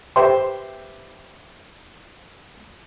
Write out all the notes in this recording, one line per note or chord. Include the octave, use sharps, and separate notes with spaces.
G4 B4 C5 E5 G5 C6